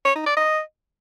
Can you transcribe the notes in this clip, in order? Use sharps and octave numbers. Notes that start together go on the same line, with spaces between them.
C#5
D#4
D5
D#5